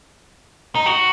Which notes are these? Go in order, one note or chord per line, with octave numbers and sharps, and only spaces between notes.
D#4
F#4